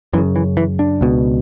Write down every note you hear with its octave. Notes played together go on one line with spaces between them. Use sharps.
F#2 C#3 E3
E3
E3
D4
C#2 B2